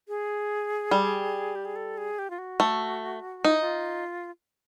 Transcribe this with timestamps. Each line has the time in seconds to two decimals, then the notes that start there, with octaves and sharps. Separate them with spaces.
0.08 G#4
0.91 G3
1.55 G4
1.65 G#4
1.76 A4
1.98 G#4
2.19 G4
2.30 F4
2.38 F#4
2.60 A3
3.44 D#4 F4
3.52 E4
3.61 F4